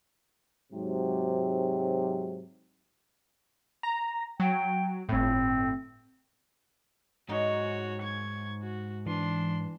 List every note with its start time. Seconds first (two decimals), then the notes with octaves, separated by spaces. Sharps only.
0.73 G#2 C3 F#3
3.83 A#5
4.40 F#3 G5
5.09 G1 A2 C4
7.29 G#2 F#3 D#4 F#4 C#5
8.01 C#5 C#6 G#6
8.63 F#4
9.06 E3 D4 C6